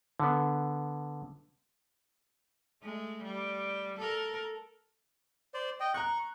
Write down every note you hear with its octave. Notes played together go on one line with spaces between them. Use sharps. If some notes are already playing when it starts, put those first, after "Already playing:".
D3 B3
G#3 A3
G3
A4 A#4
C5 D5
D#5 G5
A#5 C#6 F#6